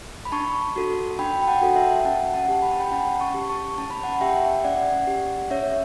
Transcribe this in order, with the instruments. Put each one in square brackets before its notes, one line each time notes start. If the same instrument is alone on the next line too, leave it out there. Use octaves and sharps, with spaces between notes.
[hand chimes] B5
D4 A5 C#6
F#4 A4
D4 G5 B5
G5
F#5 A5
F#4 A4
E5 G5
C#4 F#5 A5
F#5 A5
G4
B5
A5
G5 B5
C#4 F#5 A5
A5 C#6
G4
A5 C#6
C#4 A5
B5
F#5 A5
G4 E5 G5
C#4 D5 F#5
G4
C#4 C#5 E5